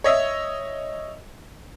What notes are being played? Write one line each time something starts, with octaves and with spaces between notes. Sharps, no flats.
C#5 D#5 E5